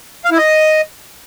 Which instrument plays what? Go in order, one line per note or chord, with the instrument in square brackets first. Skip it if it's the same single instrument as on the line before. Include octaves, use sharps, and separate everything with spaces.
[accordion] F5
E4
D#5